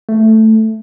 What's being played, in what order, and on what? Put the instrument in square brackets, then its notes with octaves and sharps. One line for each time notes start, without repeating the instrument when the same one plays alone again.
[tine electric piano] A3